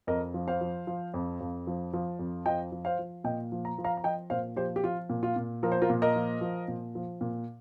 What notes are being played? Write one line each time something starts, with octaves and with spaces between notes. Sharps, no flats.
F2 A#4 D#5
F3
C5 F5
F3
F3
F2
F2
F3
F3
F2
F3 D#5 G5
F3
C5 F5
F3
A#2 D#5 G5
F3
A#5
F3
F5 A#5
A#5
F3 D#5 G5
A#2 C5 F5
F3 G4 C5
G4
F3 F4
A#2
F4
A#2
F3 A#4
C5
F4 A#4
A#2
A#4 D#5
F3
F3
A#2
F3
A#2